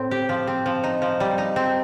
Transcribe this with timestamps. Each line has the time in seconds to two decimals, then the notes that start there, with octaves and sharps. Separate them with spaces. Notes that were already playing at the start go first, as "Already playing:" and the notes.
Already playing: A2 C4
0.11 G4
0.29 F3
0.47 C4
0.66 F3
0.84 D#4
1.02 F3
1.20 G3
1.38 D#4
1.56 C4